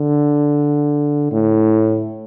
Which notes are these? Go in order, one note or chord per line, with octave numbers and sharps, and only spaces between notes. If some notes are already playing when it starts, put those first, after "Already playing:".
Already playing: D3
A2